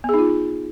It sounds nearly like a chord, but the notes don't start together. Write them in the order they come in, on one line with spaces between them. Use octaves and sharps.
B3 G#4 D#4 F4